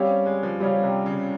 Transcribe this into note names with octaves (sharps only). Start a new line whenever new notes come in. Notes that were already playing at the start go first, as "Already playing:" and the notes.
Already playing: G3 C4 C#4 G4 C#5 F5
G#3
F3
C#3 G3 C#4 G4 C#5 F5
C3
C#3